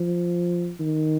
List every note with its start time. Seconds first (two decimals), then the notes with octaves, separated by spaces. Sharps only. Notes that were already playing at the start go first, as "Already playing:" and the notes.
Already playing: F3
0.80 D#3